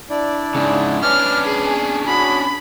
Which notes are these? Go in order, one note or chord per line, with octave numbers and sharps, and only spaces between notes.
D4 E4 D5
G#2 C#3
C#4 D4 B4 D6 F6
G#4
F#4 G#4 B5